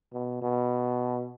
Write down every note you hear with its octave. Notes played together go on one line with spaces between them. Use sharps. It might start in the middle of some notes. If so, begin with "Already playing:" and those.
B2
B2